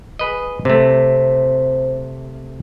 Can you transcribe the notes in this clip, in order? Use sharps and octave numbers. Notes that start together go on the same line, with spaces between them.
G#4 B4 D#5
C3 A3 C5